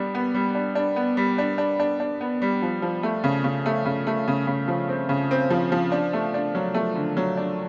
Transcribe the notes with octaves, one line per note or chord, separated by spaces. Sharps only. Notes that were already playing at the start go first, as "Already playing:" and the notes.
Already playing: G3 B3 D4
B3
G3
D4
D4
B3
G3
D4
D4
D4
D4
B3
G3
F3
F3
A3
C#3
C#3
A3
C#3
A3
C#3
C#3
F3
C4
C#3
C4
F3
F3
D4
A3
D4
F#3
A3
D3
F#3
D4